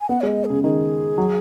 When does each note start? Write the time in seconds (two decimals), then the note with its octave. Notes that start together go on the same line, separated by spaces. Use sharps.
0.01 G#5
0.09 B3 F#5
0.21 G#3 C#5
0.27 D#5
0.45 G#4
0.50 C#3
0.64 D#3 G#4
1.18 F#3